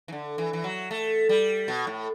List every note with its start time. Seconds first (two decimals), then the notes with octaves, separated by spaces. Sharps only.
0.08 E3
0.12 D3
0.38 E3
0.53 E3
0.64 F#3
0.91 A3
1.29 G3
1.68 B2
1.87 A2